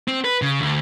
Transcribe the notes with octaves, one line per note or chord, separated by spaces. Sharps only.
C4
B4
C#3
D2